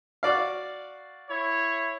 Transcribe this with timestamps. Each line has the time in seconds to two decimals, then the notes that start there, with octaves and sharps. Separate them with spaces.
0.23 F#4 D5 F5
1.30 E4 C#5